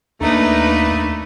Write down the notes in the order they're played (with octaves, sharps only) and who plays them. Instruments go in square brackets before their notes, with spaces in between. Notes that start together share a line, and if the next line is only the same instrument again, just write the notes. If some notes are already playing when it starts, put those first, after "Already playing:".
[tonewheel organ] D#2 D4 A#5 [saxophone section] A3 [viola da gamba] A#3 D#4 B4